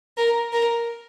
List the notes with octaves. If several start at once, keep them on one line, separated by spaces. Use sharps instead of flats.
A#4
A#4